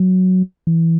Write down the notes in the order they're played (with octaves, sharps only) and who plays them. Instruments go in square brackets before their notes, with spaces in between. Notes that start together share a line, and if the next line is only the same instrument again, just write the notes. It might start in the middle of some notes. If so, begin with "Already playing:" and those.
Already playing: [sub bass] F#3
E3